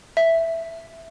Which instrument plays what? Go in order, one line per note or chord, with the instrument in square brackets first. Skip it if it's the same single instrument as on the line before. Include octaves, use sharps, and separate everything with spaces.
[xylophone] E5